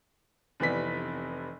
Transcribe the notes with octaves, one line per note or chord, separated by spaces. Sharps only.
F1 C3 E3 B3 D5 B6